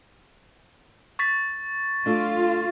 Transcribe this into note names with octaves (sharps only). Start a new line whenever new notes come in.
C#6 A6 B6
A3 D4 F4